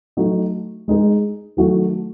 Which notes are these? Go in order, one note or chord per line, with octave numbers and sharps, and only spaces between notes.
F#3 A3 D#4
G#3 D#4 G#4
D#3 F#3 A3